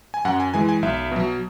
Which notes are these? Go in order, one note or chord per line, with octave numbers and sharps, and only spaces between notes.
G#5
F#2 F#5
G#5
E3 G#3 G#5
G#5
B1 E5
B2 F#3